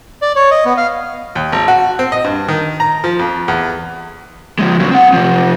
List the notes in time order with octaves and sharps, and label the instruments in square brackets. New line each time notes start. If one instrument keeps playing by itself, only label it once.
[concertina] D5
C#5
D#5
B3
F5
[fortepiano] D#2
G#1
F#4
C4
D#5
G2
D#3
A#5
F3
F2
E2
[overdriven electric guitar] F3 G#3
C#2 F#3
C4 F#5
C3 F3